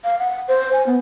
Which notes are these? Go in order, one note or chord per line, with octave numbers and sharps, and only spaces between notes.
F5
F#5
C5
G#5
B3